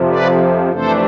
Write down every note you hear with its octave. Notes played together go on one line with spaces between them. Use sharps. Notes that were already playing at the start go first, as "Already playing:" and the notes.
Already playing: F2 C3 F3
B4 D5
F2 C3 E3 A3 D4 A4 C5